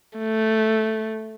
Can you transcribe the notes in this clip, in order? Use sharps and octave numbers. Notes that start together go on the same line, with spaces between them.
A3